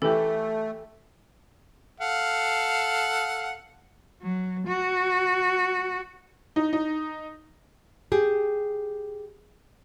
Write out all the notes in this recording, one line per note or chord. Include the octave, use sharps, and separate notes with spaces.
E3 A3 G4 A4
A4 F5 F#5
F#3
F#4
D#4
D#4
G4 G#4